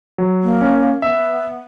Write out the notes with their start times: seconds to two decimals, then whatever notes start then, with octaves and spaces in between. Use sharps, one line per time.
0.18 F#3
0.43 A#3
0.61 C#4
1.02 B3 E5